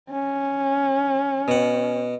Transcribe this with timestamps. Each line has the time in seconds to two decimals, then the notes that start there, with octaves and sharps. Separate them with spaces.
0.11 C#4
1.48 B2 F#5